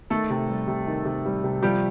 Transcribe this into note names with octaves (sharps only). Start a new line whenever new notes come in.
D#3 A3 A4
C3
G3
C3
D#3
C3
G3
C3
F3 G3 G4